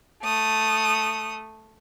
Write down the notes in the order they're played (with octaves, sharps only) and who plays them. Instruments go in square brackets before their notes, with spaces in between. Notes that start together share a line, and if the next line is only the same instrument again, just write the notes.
[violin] A3 D#6